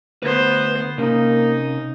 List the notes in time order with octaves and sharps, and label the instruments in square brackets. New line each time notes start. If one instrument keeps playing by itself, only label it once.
[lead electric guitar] D2 B4 [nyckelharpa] B3 C5
[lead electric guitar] C3 C#4 [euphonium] A#3 [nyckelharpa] D#4